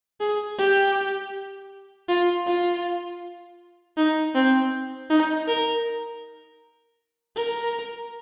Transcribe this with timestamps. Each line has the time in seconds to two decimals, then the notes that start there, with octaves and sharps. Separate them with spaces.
0.20 G#4
0.58 G4
2.09 F4
2.47 F4
3.97 D#4
4.35 C4
5.10 D#4
5.48 A#4
7.36 A#4